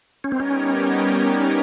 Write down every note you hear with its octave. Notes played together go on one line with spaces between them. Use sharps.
G3 B3 C#4 D#4 G4 A#4
C4
C#4